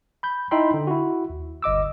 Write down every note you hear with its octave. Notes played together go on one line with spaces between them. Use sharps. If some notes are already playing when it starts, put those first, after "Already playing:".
B5 G6
D#4 E4 E5 G5 B5 C6
D3
E4 F#4
D#2
G1 D#5 D6 E6